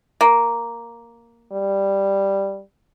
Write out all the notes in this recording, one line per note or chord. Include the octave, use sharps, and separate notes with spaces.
A#3
G3